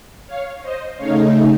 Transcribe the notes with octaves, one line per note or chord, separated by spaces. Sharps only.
C#5 F5
C5 D#5
C#3 A3 D#4 C#5 F5